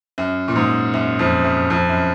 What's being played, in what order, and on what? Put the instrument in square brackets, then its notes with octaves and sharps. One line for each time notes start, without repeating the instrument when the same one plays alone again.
[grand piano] F#2
A#2
G#2
F#2
F2
F#2
F2
F#2